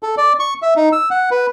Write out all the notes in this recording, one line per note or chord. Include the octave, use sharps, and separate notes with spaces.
A4
D5
C#6
E5
D#4
E6
F#5
B4